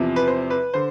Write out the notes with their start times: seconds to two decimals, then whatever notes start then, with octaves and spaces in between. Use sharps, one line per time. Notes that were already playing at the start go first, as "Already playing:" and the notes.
Already playing: E2 C3 F3
0.16 B4
0.27 C5
0.50 B4
0.74 D3 C5